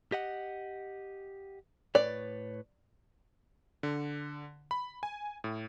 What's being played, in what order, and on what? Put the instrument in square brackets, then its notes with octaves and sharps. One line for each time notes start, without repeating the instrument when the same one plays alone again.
[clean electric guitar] G4 D#5 F#5
[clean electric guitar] A2 B4 C#5 [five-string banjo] D5
[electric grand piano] D3
B5
G#5
A2